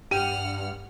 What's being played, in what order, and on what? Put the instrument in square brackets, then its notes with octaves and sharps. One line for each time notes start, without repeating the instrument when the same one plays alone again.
[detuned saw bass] G2 [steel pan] G4 G5 [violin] F#5 F6 [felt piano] D#7